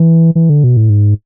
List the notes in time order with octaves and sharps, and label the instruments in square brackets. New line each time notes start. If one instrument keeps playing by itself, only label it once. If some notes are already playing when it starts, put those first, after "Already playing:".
Already playing: [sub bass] E3
E3
D3
B2
A2
G#2